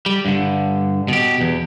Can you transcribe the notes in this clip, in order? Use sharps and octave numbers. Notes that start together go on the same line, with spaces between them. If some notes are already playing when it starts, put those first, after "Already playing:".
G3
G2 D3
B2 G4
E2